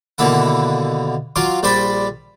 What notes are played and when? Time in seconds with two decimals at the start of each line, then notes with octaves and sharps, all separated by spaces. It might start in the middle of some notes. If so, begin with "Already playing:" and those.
0.18 D#2 B2 D3 A#3 E4 F#5
1.36 F#3 F4 C6 D6
1.63 A#1 G3 C5 D5 B5